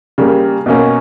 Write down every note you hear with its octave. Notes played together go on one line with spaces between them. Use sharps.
C#3 G3 A#3
B2 A#3 C#4